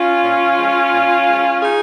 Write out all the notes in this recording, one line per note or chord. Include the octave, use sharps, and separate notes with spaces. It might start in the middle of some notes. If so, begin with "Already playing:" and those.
Already playing: C#4 F4
A#2
F3 G#3
A#2
F3 G#3
D#4 G#4